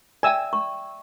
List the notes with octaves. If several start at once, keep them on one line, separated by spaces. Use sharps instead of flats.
D5 E5 G5 G#5 E6
C#6